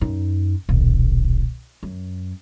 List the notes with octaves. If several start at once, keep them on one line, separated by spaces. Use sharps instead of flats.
F#2 D#4
D#1 B1
F#2